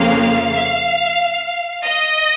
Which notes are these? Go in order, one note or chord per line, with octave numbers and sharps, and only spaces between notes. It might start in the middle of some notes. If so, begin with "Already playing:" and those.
Already playing: F2 C#3 F3 A#3 F5
D#5